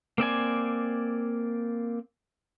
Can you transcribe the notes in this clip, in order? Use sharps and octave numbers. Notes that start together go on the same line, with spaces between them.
A#3 C4 D5 G#5